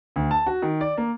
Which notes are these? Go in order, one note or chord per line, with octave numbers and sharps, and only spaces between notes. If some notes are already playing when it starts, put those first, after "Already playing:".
D2
A5
F#4
D#3
D5
A#3